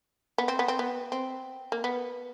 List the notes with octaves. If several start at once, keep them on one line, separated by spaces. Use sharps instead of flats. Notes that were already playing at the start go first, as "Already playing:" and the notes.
B3
C4
B3
C4
B3
C4
A#3
B3